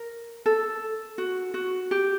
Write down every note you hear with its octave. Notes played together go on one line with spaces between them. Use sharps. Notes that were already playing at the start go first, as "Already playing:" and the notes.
Already playing: A#4
A4
F#4
F#4
G4